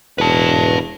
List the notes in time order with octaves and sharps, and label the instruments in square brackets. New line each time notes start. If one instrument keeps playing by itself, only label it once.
[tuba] E1 [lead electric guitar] B4 A5